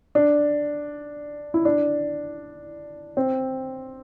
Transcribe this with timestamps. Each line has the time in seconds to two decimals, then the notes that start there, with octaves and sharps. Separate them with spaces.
0.15 D4
1.54 E4
1.65 D4
3.17 C4